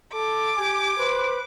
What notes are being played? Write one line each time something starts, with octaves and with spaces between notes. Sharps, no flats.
A4 D6
G4 G#5
B4 C5